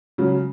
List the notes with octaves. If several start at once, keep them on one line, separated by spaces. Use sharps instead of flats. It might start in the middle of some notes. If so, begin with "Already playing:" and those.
C#3 F#3 G#3